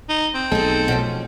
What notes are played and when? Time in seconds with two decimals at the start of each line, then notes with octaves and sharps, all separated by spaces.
0.09 D#4
0.34 C4
0.52 B1 A3 D#4 G#4 A4
0.88 B2 F3 C#4